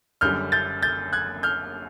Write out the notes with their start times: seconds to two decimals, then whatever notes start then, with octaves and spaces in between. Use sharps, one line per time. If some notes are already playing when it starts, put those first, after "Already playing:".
0.21 F#1 F#2 D3 G3 F6 G6
0.52 G6 A6
0.82 G6 A6
1.13 F#6 G#6
1.43 F6 G6